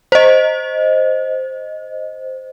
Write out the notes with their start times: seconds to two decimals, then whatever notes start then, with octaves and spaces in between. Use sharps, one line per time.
0.12 C5 D#5